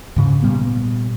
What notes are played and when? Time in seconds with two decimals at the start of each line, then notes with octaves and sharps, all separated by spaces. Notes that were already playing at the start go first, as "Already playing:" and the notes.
0.16 G#2 C#3
0.42 A#2 G3 B3